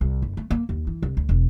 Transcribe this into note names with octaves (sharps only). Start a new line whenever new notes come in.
C2
F#1
A3
A#3
D#2
E3
C2
D2
E1